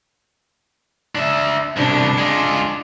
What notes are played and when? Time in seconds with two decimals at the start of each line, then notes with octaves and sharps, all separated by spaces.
1.15 D4 E5
1.77 C2 B2 D4
2.18 G#3 F4